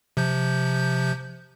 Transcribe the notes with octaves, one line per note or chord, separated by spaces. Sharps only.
C3 F3 G6